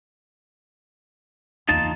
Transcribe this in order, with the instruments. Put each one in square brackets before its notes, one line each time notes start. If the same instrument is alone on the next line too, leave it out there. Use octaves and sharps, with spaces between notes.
[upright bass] F#1 E2 [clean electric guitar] D#4 F4 A5